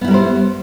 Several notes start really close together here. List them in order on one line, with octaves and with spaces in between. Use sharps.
B3 E4 G3 A#4 C5